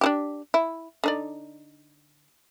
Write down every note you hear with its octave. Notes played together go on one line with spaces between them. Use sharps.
D4 E4 G4
E4
D3 D#4 D5